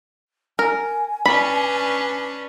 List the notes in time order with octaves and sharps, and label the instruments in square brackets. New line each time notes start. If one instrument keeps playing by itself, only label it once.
[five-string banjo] A#4 [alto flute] G#5
[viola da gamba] C#4 D4 B4 [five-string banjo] B5